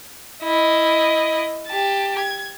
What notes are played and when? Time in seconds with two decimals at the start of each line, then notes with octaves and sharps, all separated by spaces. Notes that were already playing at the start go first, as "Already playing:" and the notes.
0.43 E4 D#5
1.68 G4 A5
2.18 G#6